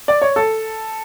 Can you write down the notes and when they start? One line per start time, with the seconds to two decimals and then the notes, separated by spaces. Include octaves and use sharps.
0.08 D5
0.22 C#5
0.36 A4